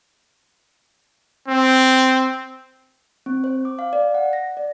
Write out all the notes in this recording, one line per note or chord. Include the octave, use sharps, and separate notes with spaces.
C4
C4
C5
D6
F5
D5
F#5
A#6
D5